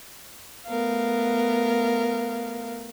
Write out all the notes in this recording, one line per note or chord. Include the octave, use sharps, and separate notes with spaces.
A3 B3 A#4 F5